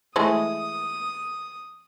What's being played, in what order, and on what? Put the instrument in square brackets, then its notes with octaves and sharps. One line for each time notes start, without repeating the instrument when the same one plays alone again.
[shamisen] E3 G#3 A3 [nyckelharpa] D#6